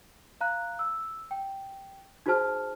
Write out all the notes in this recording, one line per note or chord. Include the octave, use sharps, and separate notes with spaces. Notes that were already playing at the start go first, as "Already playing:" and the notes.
F5 A#5 F#6
E6
G5
D#4 F#4 G#4 C5 A5 F6